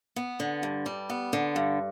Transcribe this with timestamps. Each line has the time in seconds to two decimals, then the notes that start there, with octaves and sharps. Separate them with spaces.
0.16 B3
0.40 D3
0.63 G2
0.86 G3
1.10 B3
1.33 D3
1.56 G2